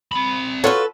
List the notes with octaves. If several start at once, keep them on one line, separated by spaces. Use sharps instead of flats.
C4 B5
F4 F#4 A4 B4 C#5